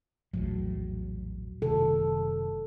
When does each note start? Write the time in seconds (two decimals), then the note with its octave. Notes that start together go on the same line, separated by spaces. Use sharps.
0.34 A#1 E2 A2 F#3
1.62 F#1 C3 D#3 A4